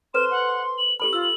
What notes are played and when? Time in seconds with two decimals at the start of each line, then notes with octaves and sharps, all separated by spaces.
0.14 A4 B4 C5 C6 E7
0.31 F#5
0.78 F#7
1.00 G4 A4 B5 F#7
1.13 F4 E6